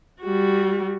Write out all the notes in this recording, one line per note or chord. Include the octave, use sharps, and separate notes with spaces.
G3 F#4